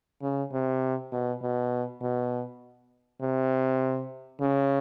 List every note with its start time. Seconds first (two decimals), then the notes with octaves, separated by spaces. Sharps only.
0.22 C#3
0.53 C3
1.12 B2
1.42 B2
2.01 B2
3.22 C3
4.41 C#3